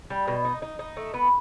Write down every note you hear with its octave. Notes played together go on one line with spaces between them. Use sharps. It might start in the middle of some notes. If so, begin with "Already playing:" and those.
G3
B2
D#4
D#4
D#4
A3
B3